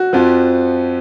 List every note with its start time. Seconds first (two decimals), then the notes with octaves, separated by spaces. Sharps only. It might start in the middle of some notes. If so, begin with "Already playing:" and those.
Already playing: F#4
0.13 F2 F3